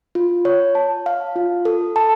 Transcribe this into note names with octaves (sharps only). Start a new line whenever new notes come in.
F4
C#5
A5
F5
F4
A4
A5